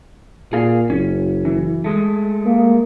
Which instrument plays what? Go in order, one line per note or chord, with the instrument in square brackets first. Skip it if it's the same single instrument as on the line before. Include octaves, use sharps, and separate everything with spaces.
[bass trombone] A#2 [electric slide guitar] G#4 F5
[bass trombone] F#1 [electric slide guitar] C#4
[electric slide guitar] E3
G#3 A3
[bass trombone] A#3